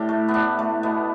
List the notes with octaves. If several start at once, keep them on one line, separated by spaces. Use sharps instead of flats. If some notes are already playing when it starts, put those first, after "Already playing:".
Already playing: A2 D4 E4 G4
A3
B3
A2 D4
A3
B2 B3